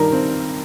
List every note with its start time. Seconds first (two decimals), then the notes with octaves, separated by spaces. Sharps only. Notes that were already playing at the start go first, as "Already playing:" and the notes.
Already playing: G2 D#3 G3 A#4
0.12 C4